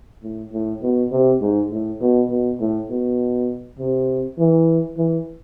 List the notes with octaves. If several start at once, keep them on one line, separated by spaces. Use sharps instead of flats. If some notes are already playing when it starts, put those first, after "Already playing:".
A2
A2
B2
C3
G#2
A2
B2
B2
A2
B2
C3
E3
E3